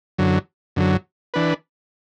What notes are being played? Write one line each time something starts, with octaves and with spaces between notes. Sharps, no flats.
F#2 D3 F#3
F#2 D3 F#3
E3 D4 B4